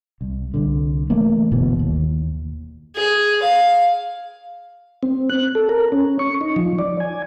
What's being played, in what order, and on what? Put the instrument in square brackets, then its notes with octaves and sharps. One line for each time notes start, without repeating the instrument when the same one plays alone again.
[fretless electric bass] C2
C2 D3
E3 A3 A#3
G1 B2 E3
D#2
[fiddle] G#4
F5
[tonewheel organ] C4
F#6
A4
A#4
C#4
C#6
D#4
F3
D5
G#5